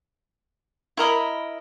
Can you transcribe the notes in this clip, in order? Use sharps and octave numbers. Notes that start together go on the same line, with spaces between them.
E4 A#4 D#5 B5